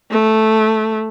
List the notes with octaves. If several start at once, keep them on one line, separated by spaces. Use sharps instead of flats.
A3